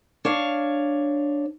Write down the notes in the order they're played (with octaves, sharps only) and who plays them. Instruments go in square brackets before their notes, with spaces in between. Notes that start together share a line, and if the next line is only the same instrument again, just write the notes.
[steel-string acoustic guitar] D4 C#5 F5